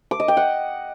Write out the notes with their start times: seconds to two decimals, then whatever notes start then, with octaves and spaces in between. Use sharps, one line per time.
0.11 D6
0.20 D#5
0.28 G5
0.37 F#5